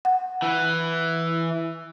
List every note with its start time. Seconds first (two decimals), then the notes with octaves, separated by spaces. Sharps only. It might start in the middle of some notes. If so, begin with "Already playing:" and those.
0.05 F#5
0.42 E3